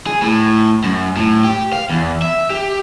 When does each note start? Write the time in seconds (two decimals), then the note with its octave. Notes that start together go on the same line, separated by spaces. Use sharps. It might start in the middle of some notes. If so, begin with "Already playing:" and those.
0.07 G#4
0.22 A2
0.84 F#2
1.17 A2
1.44 G4
1.73 F5
1.90 E2
2.22 E5
2.50 G4